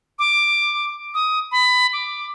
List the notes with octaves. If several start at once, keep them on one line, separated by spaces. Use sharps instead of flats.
D6
D#6
B5
D6